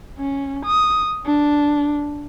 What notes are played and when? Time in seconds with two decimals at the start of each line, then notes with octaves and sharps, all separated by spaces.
0.18 C#4
0.65 D#6
1.26 D4